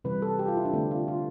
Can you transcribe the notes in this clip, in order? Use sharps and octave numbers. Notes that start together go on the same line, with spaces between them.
C3 E3 G3 B4
A4
G4
F4
E4
D4
D3 A3 C4
F4
F4